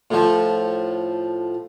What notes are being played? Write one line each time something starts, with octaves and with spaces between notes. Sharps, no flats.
A2 F3